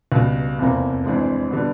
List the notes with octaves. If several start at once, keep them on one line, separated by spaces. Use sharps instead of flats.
C#2 B2 G3
F1 E2 C3 F3 A#3
G#1 G2 E3 G#3 C4
D3 G3 B3